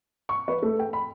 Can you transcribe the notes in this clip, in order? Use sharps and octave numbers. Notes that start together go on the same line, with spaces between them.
C#6
B4
A3
G5
B5